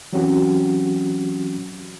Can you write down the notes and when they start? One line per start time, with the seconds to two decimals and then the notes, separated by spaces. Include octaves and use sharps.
0.13 E3 F#3 C4 C#4 F#4 G4